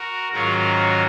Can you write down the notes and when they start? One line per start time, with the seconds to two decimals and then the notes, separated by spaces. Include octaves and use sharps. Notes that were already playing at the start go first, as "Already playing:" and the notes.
Already playing: F#4 A#4
0.32 G#2 D#3 F#3 C#4 F4 F#4 A#4